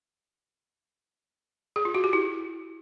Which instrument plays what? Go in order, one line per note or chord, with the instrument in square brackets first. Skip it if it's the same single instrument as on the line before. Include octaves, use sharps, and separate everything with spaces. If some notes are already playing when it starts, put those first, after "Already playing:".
[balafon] G#4
F4
F#4
G4
E4